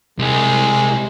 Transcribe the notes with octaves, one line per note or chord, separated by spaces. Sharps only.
C2 G#3